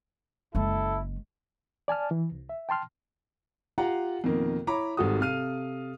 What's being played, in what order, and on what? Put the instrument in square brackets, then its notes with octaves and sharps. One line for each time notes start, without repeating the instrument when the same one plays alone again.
[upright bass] F#1 G#3 [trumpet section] E4 A4
[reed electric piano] D5 G#5 A5 F6
E3
C2
E5
G5 A5 C6 F6
[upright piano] F4 G4 F5 F#5 A#5
F2 B2 D#3 A#3
E4 C#5 A#5 B5 D6
G#1 G#2 G3 F#4 A4 D#6
C3 A4 F5 F6 D#7